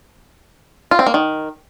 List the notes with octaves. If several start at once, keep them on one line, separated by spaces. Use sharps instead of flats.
F4
C4
A#3
D#3